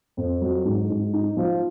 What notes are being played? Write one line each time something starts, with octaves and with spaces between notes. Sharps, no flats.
F2
F#3
G#2
G#2
D#4
F3